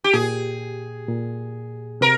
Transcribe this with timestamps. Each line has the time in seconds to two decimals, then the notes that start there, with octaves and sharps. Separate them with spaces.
0.04 G4
0.13 A#2 G#4
1.08 A#2
2.01 C3 A#4